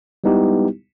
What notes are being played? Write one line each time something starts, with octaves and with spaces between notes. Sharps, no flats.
G3 G#3 B3 D#4 E4 G4